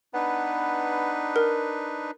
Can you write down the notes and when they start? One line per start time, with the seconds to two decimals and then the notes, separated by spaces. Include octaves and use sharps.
0.14 B3 D4 D#4 B4
1.36 A#4